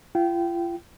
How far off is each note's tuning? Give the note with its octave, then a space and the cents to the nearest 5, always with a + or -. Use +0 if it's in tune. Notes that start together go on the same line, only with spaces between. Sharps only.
F4 -35 G5 -20